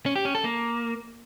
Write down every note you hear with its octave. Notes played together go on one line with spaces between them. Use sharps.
C#4
G4
C#4
A4
A#3